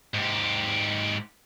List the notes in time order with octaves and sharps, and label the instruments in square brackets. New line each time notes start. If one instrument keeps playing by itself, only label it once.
[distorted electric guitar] G#2 G4